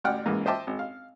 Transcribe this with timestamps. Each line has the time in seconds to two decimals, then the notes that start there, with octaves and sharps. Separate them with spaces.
0.04 A1 D2 D5 F#5 G5 F6
0.26 C#2 G#2 E3 A#3
0.46 C5 D#5 E5 G5 A5 D6
0.67 G#1
0.79 F5